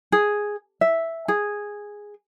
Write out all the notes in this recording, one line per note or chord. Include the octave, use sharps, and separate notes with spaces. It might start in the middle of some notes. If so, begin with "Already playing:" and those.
G#4
E5
G#4